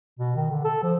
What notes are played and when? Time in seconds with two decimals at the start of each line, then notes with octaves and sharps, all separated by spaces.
0.19 B2
0.36 D#3
0.50 D3
0.64 A4
0.83 F3